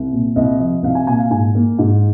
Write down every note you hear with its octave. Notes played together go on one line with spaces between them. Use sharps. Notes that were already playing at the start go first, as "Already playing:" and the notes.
Already playing: C2
A#2
C2 D#5
F3 D#5
C2 F5
G#5
A#2 G#5
F5
G#2 G#5
A#3
G#2